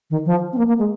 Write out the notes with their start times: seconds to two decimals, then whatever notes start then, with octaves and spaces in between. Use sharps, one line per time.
0.10 D#3
0.25 F3
0.52 C4
0.57 A#3
0.68 A#3
0.78 G#3